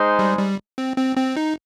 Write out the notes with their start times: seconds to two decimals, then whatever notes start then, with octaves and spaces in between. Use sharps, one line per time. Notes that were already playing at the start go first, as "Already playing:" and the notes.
Already playing: G#3 D#4 G#4 C5
0.19 G3
0.39 G3
0.78 C4
0.97 C4
1.17 C4
1.37 D#4